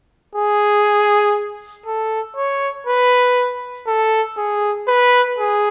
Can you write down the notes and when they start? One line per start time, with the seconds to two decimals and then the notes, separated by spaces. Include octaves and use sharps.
0.35 G#4
1.86 A4
2.37 C#5
2.87 B4
3.87 A4
4.37 G#4
4.88 B4
5.38 G#4